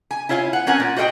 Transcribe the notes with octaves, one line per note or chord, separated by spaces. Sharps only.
G#5
E4 F4 C#5 F5 G#5
B3 F#5
C4 C#4 A#4 F#5 G#5
A#2
F#4 C5 D#5 E5 G5